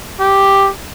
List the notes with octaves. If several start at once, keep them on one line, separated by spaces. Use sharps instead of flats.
G4